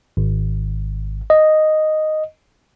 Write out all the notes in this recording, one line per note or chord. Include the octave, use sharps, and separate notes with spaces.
G#1
D#5